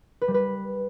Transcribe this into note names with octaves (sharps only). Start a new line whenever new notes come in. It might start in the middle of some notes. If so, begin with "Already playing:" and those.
B4
G3
B4